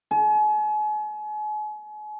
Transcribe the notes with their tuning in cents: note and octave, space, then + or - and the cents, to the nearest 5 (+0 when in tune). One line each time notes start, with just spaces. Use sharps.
G#5 +40